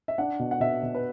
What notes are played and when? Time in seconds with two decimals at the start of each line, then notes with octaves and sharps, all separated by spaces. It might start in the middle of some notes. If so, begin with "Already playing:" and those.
0.08 E5
0.18 D4 F#5
0.39 B2
0.51 F#5
0.60 B2 E5
0.83 B2
0.95 B4